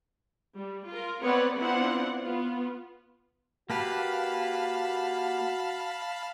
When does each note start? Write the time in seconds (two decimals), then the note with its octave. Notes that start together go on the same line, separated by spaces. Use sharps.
0.56 G3
0.88 F4 A#4
1.23 B3 C4 B4 C#5 D5 F#5
1.59 B3 C4 D4 E4 F4 F#5
2.23 B3 F4
3.70 A#3 F#4 G4 B4 F5 A5 B5